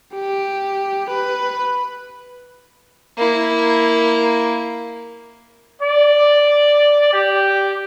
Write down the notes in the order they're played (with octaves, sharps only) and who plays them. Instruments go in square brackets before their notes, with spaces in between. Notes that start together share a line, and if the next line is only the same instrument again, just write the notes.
[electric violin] G4
B4
[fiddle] A#3 E4
[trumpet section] D5
G4